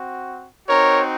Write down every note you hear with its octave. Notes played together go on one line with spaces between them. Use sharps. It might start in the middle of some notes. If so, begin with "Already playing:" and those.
Already playing: C4 F#4
C4 D#4 F#4 A#4 C#5